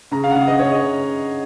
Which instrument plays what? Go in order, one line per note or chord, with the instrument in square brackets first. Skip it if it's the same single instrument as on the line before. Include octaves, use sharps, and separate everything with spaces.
[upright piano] C#3 A#5
F5
F#5
C#3 F5
D#5
C#3 C#5
D#5